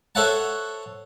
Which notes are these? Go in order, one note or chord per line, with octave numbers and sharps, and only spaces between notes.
A4 C5 C#5 E5 F#5 A5